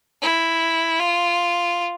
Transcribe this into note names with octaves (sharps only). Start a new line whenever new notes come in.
E4
F4